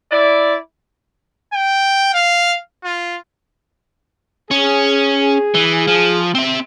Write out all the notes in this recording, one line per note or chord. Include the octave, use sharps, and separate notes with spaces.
E4 D5
G5
F5
F4
C#4 G#4
E3
F3
C4 E5